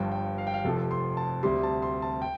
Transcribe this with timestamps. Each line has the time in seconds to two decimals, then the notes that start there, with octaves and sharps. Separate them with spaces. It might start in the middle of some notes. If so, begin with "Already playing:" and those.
Already playing: G1 G2 F3 G5
0.12 G5
0.38 F5
0.47 G5
0.54 F5
0.64 F1 F2 C3 F3 A4
0.91 C6
1.17 A5
1.43 D2 C3 G3 C6
1.63 A5
1.82 C6
2.02 A5
2.22 G5